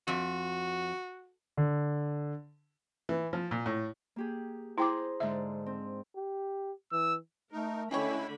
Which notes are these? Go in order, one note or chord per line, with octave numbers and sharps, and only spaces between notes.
F2 F#4
D3
E3
F3
A#2
A2
A#3 G4 G#4
E4 G#4 C5 G5 A#5 D6
G#2 D3 E5
C4
G4
E3 E6
A3 D#4 A#4
D3 G#3 A3 C#4 E4 G4 C#5 B5